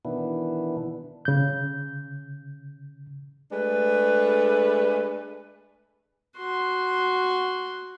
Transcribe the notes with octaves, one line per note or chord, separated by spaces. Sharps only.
B2 D#3 E3 B3 D4 E4
C#3 G6
G#3 A3 D4 B4
F#4 C6